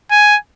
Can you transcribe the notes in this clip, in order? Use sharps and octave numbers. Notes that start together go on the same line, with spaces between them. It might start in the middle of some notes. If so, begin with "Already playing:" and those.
G#5